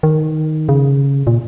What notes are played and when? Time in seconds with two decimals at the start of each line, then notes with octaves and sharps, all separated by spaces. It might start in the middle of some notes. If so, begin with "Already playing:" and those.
0.03 D#3
0.69 C#3
1.27 A#2